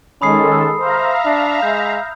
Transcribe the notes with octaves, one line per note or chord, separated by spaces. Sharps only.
D#3 G#3 C#4 A4 B5 D#6 C7
C5 E5 F5 A#5
D4
G#3 G6